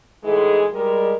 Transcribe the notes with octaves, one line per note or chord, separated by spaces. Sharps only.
A2 E3 G#3 D#4 G#4
G3 G#3 A#4